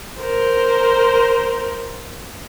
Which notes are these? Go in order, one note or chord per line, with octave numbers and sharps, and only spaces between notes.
A#4 C5